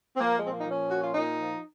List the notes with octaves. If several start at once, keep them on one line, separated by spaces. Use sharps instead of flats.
C4
F3 A#3
G#3
A#2 C4
A#3
D#4
F3 C#4
A#2 F#4
F4
A#2 D#4
F3